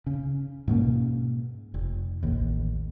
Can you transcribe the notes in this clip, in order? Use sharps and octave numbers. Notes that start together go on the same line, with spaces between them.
C#3
G#2 B2 A#3 C#4
F1
A1 D#2